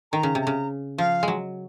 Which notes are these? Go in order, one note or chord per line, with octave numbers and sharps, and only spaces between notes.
D#3 A#5
C#3
C3
A#5
C#3
F3 F5
F#3 G#3